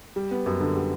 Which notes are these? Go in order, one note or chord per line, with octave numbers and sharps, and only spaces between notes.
G3
B3
F#2
D3
G3